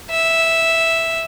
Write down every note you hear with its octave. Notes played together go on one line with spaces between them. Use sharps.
E5